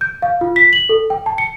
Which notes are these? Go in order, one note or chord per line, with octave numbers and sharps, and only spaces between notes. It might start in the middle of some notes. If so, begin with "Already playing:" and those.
G6
F5
F4
B6
F#7
A4
G5
A5
C#7